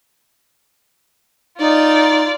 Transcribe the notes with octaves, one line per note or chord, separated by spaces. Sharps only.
D#4 F4 D5